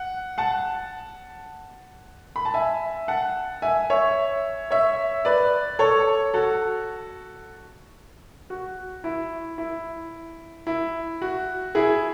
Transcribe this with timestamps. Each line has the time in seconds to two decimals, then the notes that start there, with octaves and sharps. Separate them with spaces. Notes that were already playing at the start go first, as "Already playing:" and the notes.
Already playing: F#5
0.38 F#5 A5
2.36 B5
2.45 A5
2.54 E5 G#5
3.08 F#5 A5
3.62 E5 G#5
3.90 C#5 E5
4.71 C#5 E5
5.25 B4 D5
5.79 A4 C#5
6.34 F#4 A4
8.50 F#4
9.04 E4
9.58 E4
10.67 E4
11.22 F#4
11.75 E4 G#4